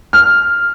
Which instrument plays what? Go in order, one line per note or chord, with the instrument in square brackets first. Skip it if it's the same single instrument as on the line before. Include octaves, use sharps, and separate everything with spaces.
[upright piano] F6